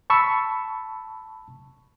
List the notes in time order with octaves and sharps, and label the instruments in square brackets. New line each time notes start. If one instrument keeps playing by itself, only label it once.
[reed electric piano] A5 B5 C#6 E6